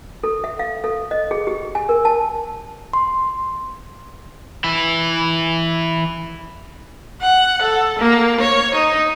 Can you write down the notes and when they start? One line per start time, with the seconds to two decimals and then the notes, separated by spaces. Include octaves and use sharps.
0.24 A4
0.44 E5
0.59 F5
0.84 A4
1.11 D#5
1.31 G#4
1.47 G4
1.75 G#5
1.89 A#4
2.05 A5
2.93 C6
4.64 E3 E4
7.22 F#5
7.62 A4
7.99 A#3
8.41 C#5
8.74 D#4